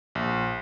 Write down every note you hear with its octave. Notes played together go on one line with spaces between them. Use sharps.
A#1